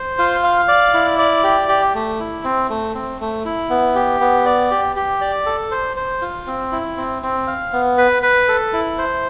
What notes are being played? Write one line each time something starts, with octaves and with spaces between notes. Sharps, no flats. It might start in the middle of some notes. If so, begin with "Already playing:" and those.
Already playing: C5
F4
F5
D5
E4
D5
G4
G4
A3
E4
C4
A3
C4
A3
E4
B3
G4
B3
D5
G4
G4
D5
A4
C5
C5
F4
C4
E4
C4
C4
F5
B3
B4
B4
A4
E4
C5